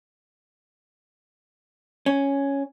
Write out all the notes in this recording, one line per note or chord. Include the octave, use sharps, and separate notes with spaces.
C#4